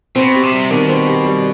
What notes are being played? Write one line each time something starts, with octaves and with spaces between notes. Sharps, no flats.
B2 C4
G4
C3
G3
B2 D#3
C4
G4
G3